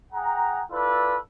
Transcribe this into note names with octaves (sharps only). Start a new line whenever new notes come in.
G#4 F#5 G5 A#5
E4 F4 A4 B4 D5